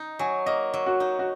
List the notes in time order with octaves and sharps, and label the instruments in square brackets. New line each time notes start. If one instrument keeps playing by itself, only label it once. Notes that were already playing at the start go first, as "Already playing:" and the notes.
Already playing: [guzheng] D#4
[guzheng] F#3 [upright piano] G#5
[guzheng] A#3 [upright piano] D#5
[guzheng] F#3
[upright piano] F#4
[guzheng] D#4
[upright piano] F#4